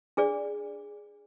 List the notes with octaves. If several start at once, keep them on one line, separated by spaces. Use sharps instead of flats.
D4 G#4 D5